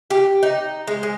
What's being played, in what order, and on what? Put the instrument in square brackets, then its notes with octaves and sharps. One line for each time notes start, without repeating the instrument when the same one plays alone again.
[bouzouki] G4
D#4
G#3
G#3